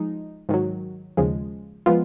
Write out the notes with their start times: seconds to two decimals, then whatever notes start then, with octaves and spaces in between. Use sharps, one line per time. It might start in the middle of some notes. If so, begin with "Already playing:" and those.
Already playing: F3 G#3 D#4
0.49 G#2 D#3 F#3
1.17 D#2 C#3 F3 G#3
1.86 F3 G#3 B3 F4